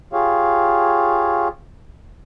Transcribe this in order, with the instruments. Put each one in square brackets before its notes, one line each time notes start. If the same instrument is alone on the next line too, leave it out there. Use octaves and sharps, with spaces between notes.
[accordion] F4 G4 G#4 C#5 F5